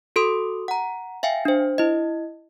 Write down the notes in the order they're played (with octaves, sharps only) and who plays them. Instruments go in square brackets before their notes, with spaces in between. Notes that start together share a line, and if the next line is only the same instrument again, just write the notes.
[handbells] F#4 A4 C6 D#6
F#5 A#5
E5 F5 G5 G#5
D4 C5
E4 D#5